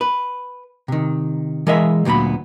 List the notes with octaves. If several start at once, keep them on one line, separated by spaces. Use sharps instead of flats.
B4
C3 D#3
E3 G#3 A#4 D#5 E5
D2 A#2 F#3 B3 B5